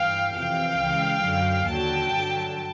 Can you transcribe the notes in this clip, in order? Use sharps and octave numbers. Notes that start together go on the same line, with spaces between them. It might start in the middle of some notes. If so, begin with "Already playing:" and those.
Already playing: G2 E3 F5 G5
F2 C3 E3 F5 G5
C#2 C#3 E3
F#2 D3 F#3
D#2 D3 F#3 G5 A5
G2 D3 F#3